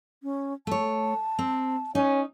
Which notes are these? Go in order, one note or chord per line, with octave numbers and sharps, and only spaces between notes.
C#4
A3 C#5 A5
C4
C#4 D#4 C#5